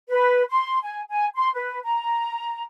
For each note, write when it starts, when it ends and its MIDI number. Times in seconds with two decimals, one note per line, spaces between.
0.09 0.42 71
0.50 0.78 84
0.82 1.00 80
1.09 1.26 80
1.36 1.49 84
1.54 1.79 71
1.84 2.62 82